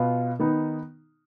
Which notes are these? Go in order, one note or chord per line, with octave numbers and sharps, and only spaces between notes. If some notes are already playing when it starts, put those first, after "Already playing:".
Already playing: B2 B3 F4
D#3 B3 D#4